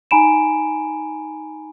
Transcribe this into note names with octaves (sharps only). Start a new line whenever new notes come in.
D#4 G#5 A#5 B5 D7 E7